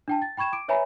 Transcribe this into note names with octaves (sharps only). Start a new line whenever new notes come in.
D4 G5 A5
A6
G5 B5 C#6 G#6 E7
D6 D7
B4 C#5 E5 G#5 A#5 B5